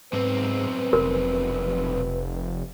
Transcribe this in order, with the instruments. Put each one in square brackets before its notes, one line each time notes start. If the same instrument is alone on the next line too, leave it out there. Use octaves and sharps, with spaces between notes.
[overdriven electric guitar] B1 C4 [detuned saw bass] G#2 [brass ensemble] B4
[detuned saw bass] F1 [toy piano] A#4